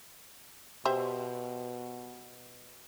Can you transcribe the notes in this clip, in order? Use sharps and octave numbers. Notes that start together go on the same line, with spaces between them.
B2 G4 C5 E5